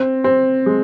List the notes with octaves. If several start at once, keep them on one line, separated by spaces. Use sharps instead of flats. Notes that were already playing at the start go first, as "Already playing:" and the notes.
Already playing: C4
C4
G#3